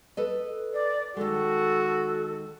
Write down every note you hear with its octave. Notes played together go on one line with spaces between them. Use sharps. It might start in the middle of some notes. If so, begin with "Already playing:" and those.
A4 B4 D#5
D5
D#3 G#3 F#4 A4